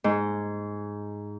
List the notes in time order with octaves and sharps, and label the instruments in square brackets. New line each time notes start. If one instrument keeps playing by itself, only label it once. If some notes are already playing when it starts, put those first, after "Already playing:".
[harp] G#2